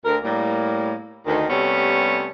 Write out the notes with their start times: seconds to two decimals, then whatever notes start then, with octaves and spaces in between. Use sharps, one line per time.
0.05 D2 A#4
0.23 A2 G3 A#3
1.27 D2 D#3
1.50 C3 G3 A3 B3 C#4